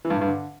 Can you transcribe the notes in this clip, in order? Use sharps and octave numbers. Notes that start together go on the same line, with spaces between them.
E3
G2
A2
G2
D3